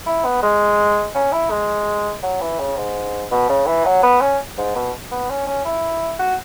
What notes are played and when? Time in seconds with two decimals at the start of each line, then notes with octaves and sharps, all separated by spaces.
0.07 E4
0.25 B3
0.43 G#3
1.15 C#4
1.32 E4
1.51 G#3
2.23 F#3
2.41 E3
2.60 C#3
2.77 G#2
3.32 B2
3.49 C#3
3.67 E3
3.85 F#3
4.03 B3
4.21 C#4
4.58 G#2
4.76 B2
5.11 B3
5.30 C#4
5.47 C#4
5.65 E4
6.19 F#4